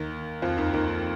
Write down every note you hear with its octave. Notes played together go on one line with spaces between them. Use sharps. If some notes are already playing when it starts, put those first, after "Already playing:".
Already playing: D#2 D#3
F2 F3
D#2 D#3
D#2 D#3